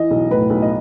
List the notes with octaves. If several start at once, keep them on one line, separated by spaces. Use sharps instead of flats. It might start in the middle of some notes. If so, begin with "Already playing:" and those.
Already playing: E3 D#5
B1
A2 B4
B1
D#5